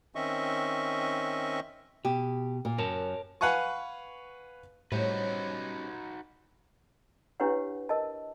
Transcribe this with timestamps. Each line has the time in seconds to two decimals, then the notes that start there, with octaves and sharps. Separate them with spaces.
0.15 D#3 C4 C#4 D#5 E5 C#6
2.05 B2 G4
2.65 A#2
2.78 F#2 A#4 C#5 A5
3.41 B4 F5 F#5 G#5 C#6
4.92 A2 G3 C#4 D#4 F#4 B4 C5
7.40 D4 E4 G4 B4 C#5 F#5
7.89 A#4 D#5 A5